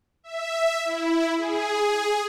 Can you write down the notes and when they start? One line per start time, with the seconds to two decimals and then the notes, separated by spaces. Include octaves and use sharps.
0.24 E5
0.85 E4
1.38 G#4